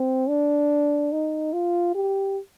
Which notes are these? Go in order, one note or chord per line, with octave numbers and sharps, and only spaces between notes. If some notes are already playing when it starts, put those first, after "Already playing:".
Already playing: C4
D4
D#4
F4
G4